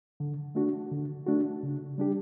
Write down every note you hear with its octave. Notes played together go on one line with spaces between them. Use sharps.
D3
A3 D4 F#4
D3
A3 D4 F#4
C#3
G3 D4 G4